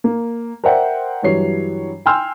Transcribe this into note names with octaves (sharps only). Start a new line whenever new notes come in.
A#3
A#4 C5 D5 E5 F#5 G5
G2 E3 F#3 G3 C#5 C7
G5 G#5 C6 E6 F6 G6